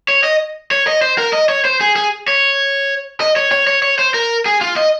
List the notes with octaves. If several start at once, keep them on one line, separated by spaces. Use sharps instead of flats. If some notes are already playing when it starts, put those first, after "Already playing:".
C#5
D#5
C#5
D#5
C5
A#4
D#5
C#5
C5
G#4
G#4
C#5
D#5
C#5
C#5
C#5
C#5
C5
A#4
G#4
F4
D#5